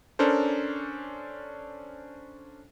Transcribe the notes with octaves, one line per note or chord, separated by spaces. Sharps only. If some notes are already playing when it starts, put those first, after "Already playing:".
C#4 D4 A4 A#4 C5